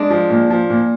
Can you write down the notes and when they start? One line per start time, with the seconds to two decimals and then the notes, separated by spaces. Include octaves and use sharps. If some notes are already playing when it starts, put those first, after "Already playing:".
Already playing: G#3 D4
0.10 F3
0.30 A#2
0.50 F3
0.70 A#2